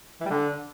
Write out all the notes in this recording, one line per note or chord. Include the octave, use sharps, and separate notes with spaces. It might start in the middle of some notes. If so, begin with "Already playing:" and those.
E3
G3
D3